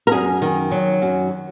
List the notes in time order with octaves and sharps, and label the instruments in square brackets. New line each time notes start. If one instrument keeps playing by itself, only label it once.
[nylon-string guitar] A#4
F#2 G#4
D#3
F#3
F#2